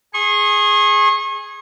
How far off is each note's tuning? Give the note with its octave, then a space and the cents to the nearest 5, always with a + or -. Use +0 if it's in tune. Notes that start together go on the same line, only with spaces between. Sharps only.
G#4 +0 C#6 -40